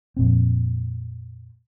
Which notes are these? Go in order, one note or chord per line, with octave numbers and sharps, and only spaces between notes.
F2 A#2 C4